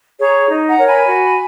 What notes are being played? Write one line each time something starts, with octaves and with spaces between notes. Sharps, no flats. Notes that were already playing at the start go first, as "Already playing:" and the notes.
G#4 C#5 A#5 C#6
D#4
F#5 A#5
A#4 C#5
G#5 B5
F#4